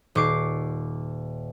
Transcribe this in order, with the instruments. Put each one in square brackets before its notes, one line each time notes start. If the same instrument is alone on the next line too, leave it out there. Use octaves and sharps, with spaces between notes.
[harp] D#1 C#6 D6 C7